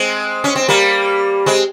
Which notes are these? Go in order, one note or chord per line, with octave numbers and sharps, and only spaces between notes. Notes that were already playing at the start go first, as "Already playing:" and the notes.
Already playing: G#3 C4
C#4
C4
G3 A#3
G#3 C4